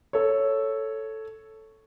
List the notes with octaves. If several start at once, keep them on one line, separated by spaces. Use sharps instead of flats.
A4 C#5